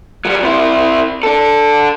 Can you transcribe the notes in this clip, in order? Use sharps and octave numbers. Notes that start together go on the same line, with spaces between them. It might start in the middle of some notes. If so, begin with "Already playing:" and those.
F#3 G3
C3 E4
D4 A4